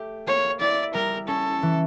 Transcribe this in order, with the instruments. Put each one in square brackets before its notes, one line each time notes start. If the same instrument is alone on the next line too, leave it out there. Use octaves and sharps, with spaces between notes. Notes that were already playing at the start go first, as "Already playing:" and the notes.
Already playing: [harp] A3 G4
[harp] A#3 [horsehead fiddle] C#5
[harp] E4 [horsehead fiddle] D5
[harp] G3 [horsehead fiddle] A#4
[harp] C#4 [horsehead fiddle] A4
[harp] E3